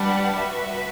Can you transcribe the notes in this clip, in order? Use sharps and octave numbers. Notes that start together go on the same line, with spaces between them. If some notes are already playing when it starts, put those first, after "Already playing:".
Already playing: G3 D4 G4 B4 F#5 A5
F#4 B4 E5